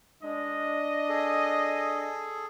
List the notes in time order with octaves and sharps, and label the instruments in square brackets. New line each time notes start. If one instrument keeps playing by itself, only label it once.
[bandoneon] G#3 [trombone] D4 [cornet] D#5
[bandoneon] G#4 A4